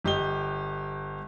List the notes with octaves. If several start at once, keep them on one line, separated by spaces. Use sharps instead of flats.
G1 G4 D#5 G7